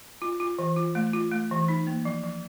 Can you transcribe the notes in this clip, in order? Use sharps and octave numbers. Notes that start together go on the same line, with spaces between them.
F4
F4
E3
F4
A3
F4
A3
E3
D#4
A#3
F3
F3